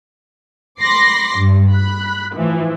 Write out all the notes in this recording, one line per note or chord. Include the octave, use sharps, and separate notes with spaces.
B5 C6 D6 A#6 C7
G2
B5 F#6
A2 E3 F3